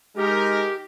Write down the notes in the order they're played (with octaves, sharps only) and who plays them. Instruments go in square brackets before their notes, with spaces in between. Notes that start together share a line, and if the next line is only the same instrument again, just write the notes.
[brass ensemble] G#3 D#4 A#4 [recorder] G4